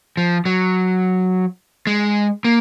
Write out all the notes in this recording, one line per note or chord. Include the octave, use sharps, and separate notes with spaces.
F3
F#3
G#3
A#3